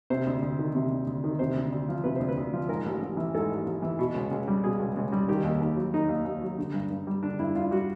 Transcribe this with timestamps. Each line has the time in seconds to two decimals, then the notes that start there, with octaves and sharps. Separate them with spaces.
0.10 C3 C5
0.27 D2
0.42 D2
0.59 D#3
0.75 C3
0.91 D2
1.07 D2
1.24 D#3
1.39 C3 C5
1.56 D2
1.72 D2
1.89 F3
2.04 C3 B4
2.16 D2 C5
2.29 B4
2.37 D2
2.53 F3
2.69 G#2 A#4
2.86 A1
3.02 A1
3.17 E3
3.34 G#2 A4
3.50 A1
3.66 A1
3.82 E3
3.99 B2
4.14 C#2
4.31 C#2
4.48 G3
4.64 B2 G#4
4.80 C#2
4.97 C#2
5.12 G3
5.28 D#3 G4
5.44 D#2
5.61 D#2
5.76 F#3
5.93 D#3 D#4
6.09 D#2
6.25 D#2
6.41 F#3
6.58 D3
6.74 G2
6.90 G2
7.07 G3
7.23 D3 D4
7.39 G2 E4
7.55 G2 F4
7.71 G3 F#4